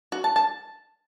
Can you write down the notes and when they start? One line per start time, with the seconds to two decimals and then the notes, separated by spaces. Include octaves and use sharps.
0.12 F#4
0.24 A5
0.36 A5